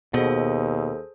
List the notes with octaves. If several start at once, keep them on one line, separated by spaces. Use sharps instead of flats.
D#2 B2 G#4 A4 C5